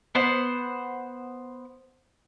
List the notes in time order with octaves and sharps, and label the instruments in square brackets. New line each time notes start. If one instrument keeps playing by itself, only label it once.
[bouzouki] B3 C5 F#5